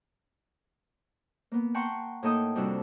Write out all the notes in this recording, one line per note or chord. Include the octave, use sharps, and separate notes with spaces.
A#3 B3
F#5 G5 A5 A#5 C6 C#6
A2 A#3 D#4 A4 G5 D#6
F2 C3 G3 D4 F#4 E6